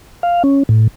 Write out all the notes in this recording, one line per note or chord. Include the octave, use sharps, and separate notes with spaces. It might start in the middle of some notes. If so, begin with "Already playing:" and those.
F5
C#4
A2